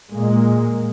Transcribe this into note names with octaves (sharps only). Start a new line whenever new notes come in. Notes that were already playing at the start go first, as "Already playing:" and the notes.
A#2 G#3 A#3